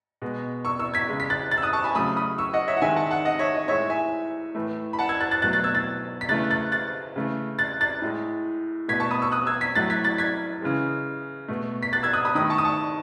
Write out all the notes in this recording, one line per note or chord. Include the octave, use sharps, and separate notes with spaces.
B2 G#3
C#6 E6
C#6 E6
G#6 B6
C#3 G#3
B6
F#6 A6
F#6 A6
E6
D#6 F#6
A5 C#6
G#5 B5
C#3 F#3 A3 B5 D#6
B5 D#6
C#6 E6
D#5 F#5
C#5 E5
F#5
D#3 G#3 E5 G#5
F#5 A5
F#5 A5
D#5 F#5
C#5 E5
D#5
A2 G#3 C#5 E5
E5 G#5
A2 E3 A3
B5
F#5 A5
E6 G#6
F#6 A6
F#6 A6
B2 F#3 A3 F#6 A6
F#6 A6
E6 G#6
F#6 A6
B6
C#3 E3 A3 F#6 A6
F#6 A6
F#6 A6
C#3 E3 A3
F#6 A6
F#6 A6
A2 G#3
B2 A3 G#6 B6
A5 C#6
B5 D#6
C#6 E6
D#6 F#6
E6 G#6
G#6 B6
A2 F#3 A3 F#6 A6
G#6 B6
F#6 A6
G#6 B6
C#3 E3 G#3
B2 A3
B6
F#6 A6
E6 G#6
D#6 F#6
B5 D#6
D#3 A3 B5 D#6
A5 C#6
D#6
A5 C#6